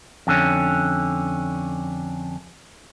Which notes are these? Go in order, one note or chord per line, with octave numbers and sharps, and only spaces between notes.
F2 D3 C#4